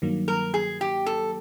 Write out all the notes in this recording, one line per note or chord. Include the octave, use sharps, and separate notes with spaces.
G2 D#3 F#3 A#3
A#4
G#4
G4
A4